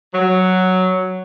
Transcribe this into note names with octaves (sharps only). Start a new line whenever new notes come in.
F#3